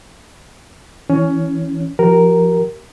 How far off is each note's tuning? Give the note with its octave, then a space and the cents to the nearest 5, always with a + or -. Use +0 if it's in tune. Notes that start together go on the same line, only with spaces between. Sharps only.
E3 +0 C#4 +15
F3 +0 G4 -30 A#4 +0